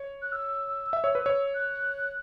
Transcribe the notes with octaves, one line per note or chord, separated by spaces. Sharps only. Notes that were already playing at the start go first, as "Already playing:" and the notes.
Already playing: C#5
F#6
E6
E5
C#5
B4
C#5
F#6